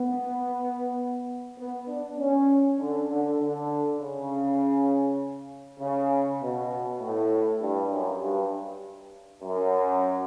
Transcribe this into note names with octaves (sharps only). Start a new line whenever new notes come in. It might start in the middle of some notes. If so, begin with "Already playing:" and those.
Already playing: B3
B3
D4
C#4
D3
D3
D3
C#3
C#3
B2
A2
G2
F#2
G2
F#2